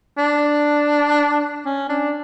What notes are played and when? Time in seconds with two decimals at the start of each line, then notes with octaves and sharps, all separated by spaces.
0.18 D4
1.65 C#4
1.89 D4